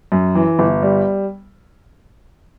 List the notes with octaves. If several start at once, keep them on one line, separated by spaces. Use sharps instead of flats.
F#2
E3
G1
G3